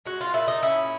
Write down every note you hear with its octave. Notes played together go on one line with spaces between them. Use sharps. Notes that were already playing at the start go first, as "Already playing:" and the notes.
G#3 F#4
F4
A#2 E4
D#4
C#4 E4